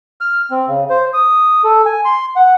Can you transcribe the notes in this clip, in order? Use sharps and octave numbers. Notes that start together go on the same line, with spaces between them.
F6
C4
C#3
C5
D#6
A4
G#5
C6
F#5